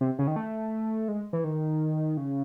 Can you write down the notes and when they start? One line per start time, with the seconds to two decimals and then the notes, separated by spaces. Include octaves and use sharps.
0.01 C3
0.19 C#3
0.27 D#3
0.36 A3
1.08 G#3
1.33 E3
1.44 D#3
2.17 C#3